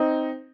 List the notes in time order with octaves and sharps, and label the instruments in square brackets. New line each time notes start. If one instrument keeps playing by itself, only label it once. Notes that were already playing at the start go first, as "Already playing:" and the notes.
Already playing: [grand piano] C4 D#4